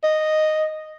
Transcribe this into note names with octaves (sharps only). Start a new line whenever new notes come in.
D#5